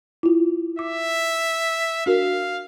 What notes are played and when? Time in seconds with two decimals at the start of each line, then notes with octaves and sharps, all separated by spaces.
0.23 E4 F4
0.79 E5 D6
2.06 D4 F#4 A#4 F5